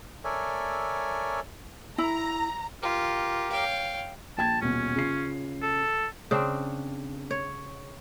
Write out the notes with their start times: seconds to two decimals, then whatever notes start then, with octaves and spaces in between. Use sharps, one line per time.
0.24 A4 A#4 C#5 D5 E5 G#5
1.98 E4 A#5
2.82 F4 G4 A#4
3.51 C#5 F5 G5
4.38 A#1 G5 A5 G#6
4.61 D#1 B2 C#4
4.96 C#3 F4 C7
5.62 A4
6.31 C#3 C4 D4
7.31 C#5